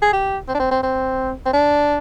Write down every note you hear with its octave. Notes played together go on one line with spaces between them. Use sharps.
G#4
G4
C4
D4
C4
C4
C4
C4
D4